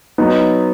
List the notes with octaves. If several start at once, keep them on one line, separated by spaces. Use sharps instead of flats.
F#3 B3 D#4